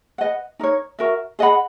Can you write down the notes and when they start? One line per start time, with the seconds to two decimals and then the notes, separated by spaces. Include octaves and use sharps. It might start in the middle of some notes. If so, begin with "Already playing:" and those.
0.18 B4 D#5 F#5
0.59 D#4 A#4 C#5
0.99 F#4 A#4 E5
1.39 G#4 D#5 F#5 B5